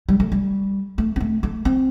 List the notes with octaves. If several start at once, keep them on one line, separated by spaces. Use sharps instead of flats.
G3
A3
G3
A3
C4
A3
A3
C4